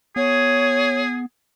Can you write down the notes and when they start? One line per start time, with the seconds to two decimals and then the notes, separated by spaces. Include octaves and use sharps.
0.16 B3 G#4 C#5